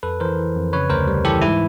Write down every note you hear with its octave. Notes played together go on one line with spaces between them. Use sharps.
F2 A4 B4
E3 A#4 C5
E3
F2
C#3 B4 C#5
D2 A#4 C5
G3
E3 G4 A4
G#2 E4